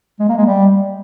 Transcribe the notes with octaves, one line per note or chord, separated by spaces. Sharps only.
G#3
A#3
G#3
G3